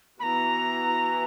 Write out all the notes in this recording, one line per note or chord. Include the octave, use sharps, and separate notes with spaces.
E3 B3 F#4 A#5 B5